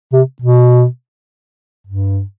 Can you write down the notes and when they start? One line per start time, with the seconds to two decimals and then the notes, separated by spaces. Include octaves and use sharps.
0.13 C3
0.42 B2
1.87 G2